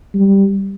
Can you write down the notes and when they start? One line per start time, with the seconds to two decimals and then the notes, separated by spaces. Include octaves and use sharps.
0.15 G3